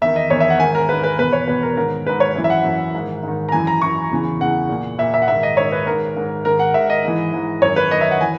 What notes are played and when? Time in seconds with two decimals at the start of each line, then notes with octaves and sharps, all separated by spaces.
0.01 E2 D#3 E5
0.16 D#5
0.30 E2 C#5
0.34 D#3
0.40 E5
0.50 F#5
0.59 G#2 D#3 G#5
0.75 A#4
0.89 G#2 D#3 B4
1.04 B4
1.18 E2 B2 B4
1.33 C#5
1.47 E2 B2 B4
1.63 A#4
1.77 G#2 D#3 A#4
2.06 G#2 D#3 B4
2.20 C#5
2.35 F#2 E3
2.44 E5
2.50 F#5
2.65 F#2 E3
2.94 G#2 D#3
3.23 G#2 D#3
3.49 A#5
3.52 F#2 E3 G#5
3.67 A#5
3.82 F#2 E3 C#6
4.11 E2 C#3 E3
4.40 E2 C#3 E3 F#5
4.69 A#2
4.98 A#2 E5
5.14 E5
5.22 F#5
5.28 G#2 D#3 E5
5.43 D#5
5.57 G#2 D#3 C#5
5.72 B4
5.86 G#2 D#3 A#4
6.16 G#2 D#3
6.45 G#2 D#3 A#4
6.59 F#5
6.74 G#2 D#3 E5
6.90 D#5
7.04 G#2 E3
7.33 G#2 E3
7.62 F#2 D#3 C#5
7.76 B4
7.91 F#2 D#3 D#5
8.01 E5
8.11 F#5
8.21 E3 G#5